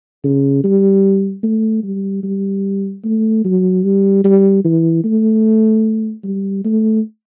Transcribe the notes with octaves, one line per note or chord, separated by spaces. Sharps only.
C#3
G3
A3
G3
G3
A3
F#3
G3
G3
E3
A3
G3
A3